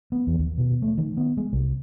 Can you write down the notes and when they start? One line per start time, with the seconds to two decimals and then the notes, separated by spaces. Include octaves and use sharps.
0.12 B3
0.27 E2
0.39 D#2
0.58 B2
0.82 A3
0.98 D#3
1.17 B3
1.37 G#3
1.53 C2